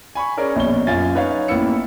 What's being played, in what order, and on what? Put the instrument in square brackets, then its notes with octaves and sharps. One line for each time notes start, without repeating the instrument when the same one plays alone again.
[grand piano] G#5 B5 C#6
C#4 G#4 A#4 D5
A#1 B2 C#5 G7
F#2 F4 F5 G#5 A6
D#4 B4 C#5 F5
A1 A#3 B3 E4 E6 C#7